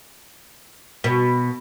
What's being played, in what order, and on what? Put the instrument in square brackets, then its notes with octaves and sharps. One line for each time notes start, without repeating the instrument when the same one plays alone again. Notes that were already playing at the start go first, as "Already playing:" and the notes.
[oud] B2